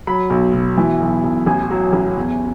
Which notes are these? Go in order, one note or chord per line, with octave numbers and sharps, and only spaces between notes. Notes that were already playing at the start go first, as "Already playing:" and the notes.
F#3 B5
B1
B2
E3
B1
B1
A1 G#5
F#3
A1
E2